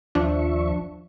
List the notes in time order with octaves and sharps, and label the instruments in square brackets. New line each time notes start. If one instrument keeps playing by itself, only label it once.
[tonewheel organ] D#2 E5 C#6 [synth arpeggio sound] F3 D4